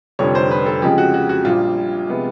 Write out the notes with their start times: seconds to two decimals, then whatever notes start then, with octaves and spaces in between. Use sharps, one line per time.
0.19 F1 F2 D3 G3 C#5
0.35 C5
0.51 B4
0.66 A4
0.82 F2 C#3 F3 G#3 C4 G4
0.98 F#4
1.14 F#4
1.29 F#4
1.45 A#1 A#2 G3 F4
2.08 C3 F3 G#3 B3